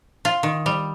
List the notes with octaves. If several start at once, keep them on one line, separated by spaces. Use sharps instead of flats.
F4
D#3
G3